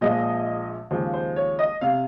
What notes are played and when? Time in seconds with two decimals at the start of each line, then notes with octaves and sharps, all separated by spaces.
0.01 A#1 A#2 F3 G#3 D#5
0.91 D#2 C#3 F3 G#3 C5
1.14 C5
1.36 C#5
1.59 D#5
1.81 C3 F5